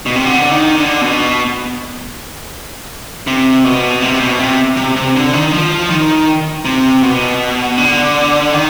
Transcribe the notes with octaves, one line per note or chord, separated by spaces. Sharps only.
B2
C3
D3
D#3
D3
B2
C3
B2
C3
B2
C3
C3
C3
D3
D#3
F3
D#3
C3
B2
D3
D#3